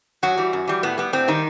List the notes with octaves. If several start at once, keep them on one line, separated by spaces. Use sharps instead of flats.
F#2 F#3 F#4
E3 G3
F#2
E3 G3
A2 B3
G3 B3
A2 C4
D#3 G3 D#4